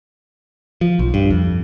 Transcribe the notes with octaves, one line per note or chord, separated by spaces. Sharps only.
F3
B1
G2
F2